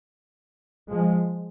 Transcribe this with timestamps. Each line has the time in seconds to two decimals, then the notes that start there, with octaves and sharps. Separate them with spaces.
0.90 F3 G#3